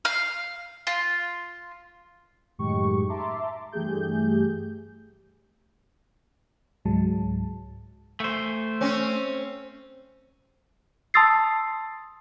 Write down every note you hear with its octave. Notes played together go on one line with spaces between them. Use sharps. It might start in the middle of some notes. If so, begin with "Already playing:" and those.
F5
F4
F#2 A2 D#3 G#3 G4 C#6
E5 A5 A#5 C6 D6
G2 E3 A3 G4 G#4 G6
C#2 G#2 F#3 G#3 A5
A3 C5
C4 C#4
A5 C6 D#6 E6 A6 C7